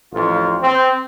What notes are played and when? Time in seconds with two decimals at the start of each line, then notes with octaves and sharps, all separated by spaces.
0.13 A1 F2 F4
0.61 C4